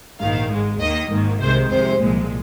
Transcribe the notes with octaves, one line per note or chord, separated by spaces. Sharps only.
A#1 G#2 D#3 F5
G#1 G#2 G#3
D#2 D#3 A#3 D#5
G#1 G#2 D#3 A#3
C2 C3 D#3 G#3 C5
F2 C3 G#3 C5
C2 A#2 F3 G#3